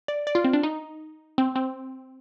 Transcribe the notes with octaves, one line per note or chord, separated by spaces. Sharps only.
D5
D5
F4
C4
D4
D#4
C4
C4